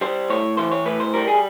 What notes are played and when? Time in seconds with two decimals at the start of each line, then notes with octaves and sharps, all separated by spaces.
0.01 G3 C5
0.30 A2 C#5
0.57 E3 C5
0.72 C#5
0.85 A2 B4
1.00 C5
1.14 G3 A#4
1.28 G#4